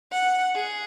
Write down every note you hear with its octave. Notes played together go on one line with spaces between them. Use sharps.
F#5
G#4